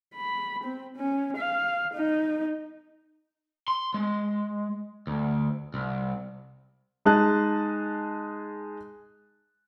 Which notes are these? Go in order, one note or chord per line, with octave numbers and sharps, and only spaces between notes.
B5
C4
C#4
F5
D#4
C6
G#3
D2
C2
G#3 D#4 G#4 D#5 A5 F#6